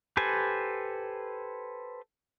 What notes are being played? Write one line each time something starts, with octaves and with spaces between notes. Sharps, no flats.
G4 A4 B4 C5 G#5